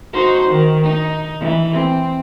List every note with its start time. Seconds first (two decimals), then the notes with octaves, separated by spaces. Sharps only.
0.13 D#4 F#4 C5
0.50 D#3
0.83 D#4
1.40 E3
1.72 C4